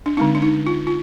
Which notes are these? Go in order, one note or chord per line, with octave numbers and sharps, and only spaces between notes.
D4
D3 G#3 C4 D#4
D4
D#4
F4
F4